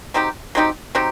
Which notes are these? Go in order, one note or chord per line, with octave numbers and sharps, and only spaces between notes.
F#3 C4 D#4 G4
F#3 C4 D#4 G4
F#3 C4 D#4 G4